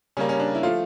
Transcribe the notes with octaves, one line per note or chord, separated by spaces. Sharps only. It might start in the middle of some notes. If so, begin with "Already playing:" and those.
C#3 G3 A#3 C#4
C#4
D4
E4
F3 A3 F4